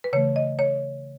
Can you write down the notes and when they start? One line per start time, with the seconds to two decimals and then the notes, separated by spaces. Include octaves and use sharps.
0.04 B4
0.13 C#3 E3 A3 C#5
0.36 D#5
0.59 C#5